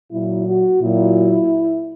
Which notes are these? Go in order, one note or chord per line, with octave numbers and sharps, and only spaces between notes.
A#2 F#3 E4
F#4
A#2 F#3 E4